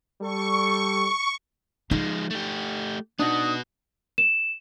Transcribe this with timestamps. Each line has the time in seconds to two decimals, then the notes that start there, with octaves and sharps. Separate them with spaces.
0.21 G3 A4 C#6
1.91 F3 G#3 D#4
2.30 A3 G4
3.19 B3 D4 D#4 F#4 D#6
4.18 E7